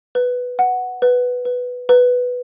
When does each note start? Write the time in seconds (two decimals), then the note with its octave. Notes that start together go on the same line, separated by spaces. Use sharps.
0.15 B4
0.59 F#5
1.02 B4
1.45 B4
1.89 B4